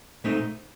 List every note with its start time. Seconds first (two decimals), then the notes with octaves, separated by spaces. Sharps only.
0.24 A#2 A3 C4 D#4